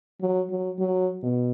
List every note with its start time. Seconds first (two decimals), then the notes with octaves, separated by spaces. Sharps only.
0.21 F#3
0.50 F#3
0.79 F#3
1.23 B2